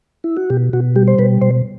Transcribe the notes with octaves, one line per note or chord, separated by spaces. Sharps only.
E4
F#4
B2 G4
B2 F#4
G3 G4
C5
B2 B4
B2 C5